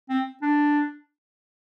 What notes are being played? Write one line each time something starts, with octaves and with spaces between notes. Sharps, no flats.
C4
D4